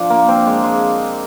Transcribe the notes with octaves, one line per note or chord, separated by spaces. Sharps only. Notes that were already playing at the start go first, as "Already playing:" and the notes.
Already playing: F3 D4
A#3
C4
G#3
G#3